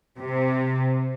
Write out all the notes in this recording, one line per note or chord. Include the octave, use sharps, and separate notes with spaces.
C3